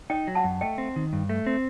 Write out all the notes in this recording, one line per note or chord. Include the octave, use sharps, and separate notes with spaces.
D#4 D#5 G5
F#3
F#5 A5
F#2
A3 D#5 G5
C4
D#3
G2
A3
C4